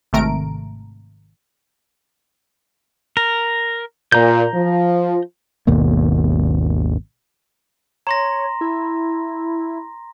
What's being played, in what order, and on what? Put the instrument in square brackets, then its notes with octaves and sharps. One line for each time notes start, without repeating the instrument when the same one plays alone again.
[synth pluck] G#1 C3 A3 A#4 D7
[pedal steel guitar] A#4
[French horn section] A#2 [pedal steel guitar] A#5 G6
[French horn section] F3
[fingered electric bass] G#1 D#2 B2 A#3
[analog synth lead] C#5 [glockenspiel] A#5 C6 A#6
[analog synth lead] E4